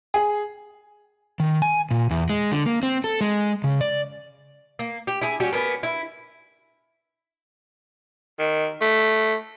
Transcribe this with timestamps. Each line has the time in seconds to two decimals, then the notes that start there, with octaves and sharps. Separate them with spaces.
0.14 G#4
1.40 D#3
1.62 G#5
1.91 A#2
2.11 E2
2.30 G#3
2.52 D3
2.66 A#3
2.83 C4
3.04 A4
3.21 G#3
3.64 C#3
3.81 D5
4.79 A#3
5.07 G4
5.21 E4 G#4
5.40 G3 C#4 F#4 G4
5.53 A#3 B3 C#4
5.83 E4
8.39 D#3
8.81 A3